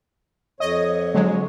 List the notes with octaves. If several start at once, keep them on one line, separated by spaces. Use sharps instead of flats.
F2 C#5 D#5
D3 F#3 G#3